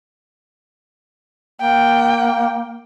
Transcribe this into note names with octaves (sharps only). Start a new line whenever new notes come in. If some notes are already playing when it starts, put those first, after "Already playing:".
A#3 G5